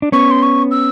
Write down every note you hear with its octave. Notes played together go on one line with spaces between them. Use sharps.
D4
B3 C#4 C#6
C6
C#6
E6